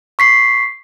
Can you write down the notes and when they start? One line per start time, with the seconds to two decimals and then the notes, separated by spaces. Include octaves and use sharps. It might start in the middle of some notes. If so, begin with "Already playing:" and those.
0.19 C#6 B6 C7